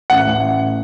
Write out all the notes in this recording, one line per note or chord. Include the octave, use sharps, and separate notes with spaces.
A1 F#5
A1